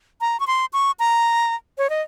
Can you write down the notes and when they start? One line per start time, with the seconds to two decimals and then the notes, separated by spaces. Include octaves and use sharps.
0.21 A#5
0.40 C#6
0.47 C6
0.73 C#6
0.99 A#5
1.78 C#5
1.90 D#5